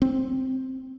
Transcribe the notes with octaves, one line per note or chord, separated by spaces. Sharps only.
C4